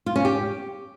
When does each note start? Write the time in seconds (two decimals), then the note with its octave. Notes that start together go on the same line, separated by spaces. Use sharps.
0.06 F4
0.16 C#4
0.25 G4